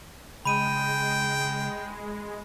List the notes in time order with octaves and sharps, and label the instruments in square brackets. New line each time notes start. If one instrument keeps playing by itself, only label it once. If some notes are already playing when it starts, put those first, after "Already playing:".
[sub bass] C#3 [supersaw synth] G#3 [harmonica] G5 [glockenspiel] B5 D#7